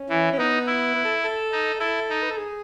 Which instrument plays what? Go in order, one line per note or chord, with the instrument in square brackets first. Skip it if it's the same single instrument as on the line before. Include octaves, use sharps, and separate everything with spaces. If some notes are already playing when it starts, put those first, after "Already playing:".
Already playing: [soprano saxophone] C#4
[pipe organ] E3
[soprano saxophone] C#4
[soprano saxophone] B3 [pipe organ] D#4
[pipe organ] E4
[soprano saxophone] B3
A4
A4
[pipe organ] D#4
[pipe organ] E4 [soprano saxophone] A4
[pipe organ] D#4
[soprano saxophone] B4
A4
G#4